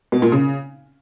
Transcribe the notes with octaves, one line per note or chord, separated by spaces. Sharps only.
B2
A#2
C#3